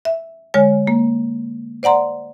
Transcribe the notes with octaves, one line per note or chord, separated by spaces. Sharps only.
E5
D3 G#3 C#5 G#5
A#3
C5 D5 F#5 A#5 C6